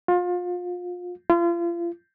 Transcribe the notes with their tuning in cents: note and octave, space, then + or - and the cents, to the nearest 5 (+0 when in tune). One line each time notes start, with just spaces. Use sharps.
F4 +30
F4 -35